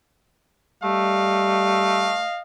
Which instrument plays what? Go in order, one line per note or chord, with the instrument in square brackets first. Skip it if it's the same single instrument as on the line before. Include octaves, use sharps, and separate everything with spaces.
[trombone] G3 [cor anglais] A3 [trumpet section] D#5 F5